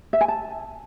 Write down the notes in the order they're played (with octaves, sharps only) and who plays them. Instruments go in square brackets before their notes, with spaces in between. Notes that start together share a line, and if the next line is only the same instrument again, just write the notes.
[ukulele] E5
G#5
A5